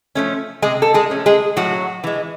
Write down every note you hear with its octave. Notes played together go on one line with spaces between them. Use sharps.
F3 A3 C#4
C3 G#3 G#4
A4
G#3 G#4
F3 A3 C#4
G#3 G#4
A2 F#3 F#4
E3 G#3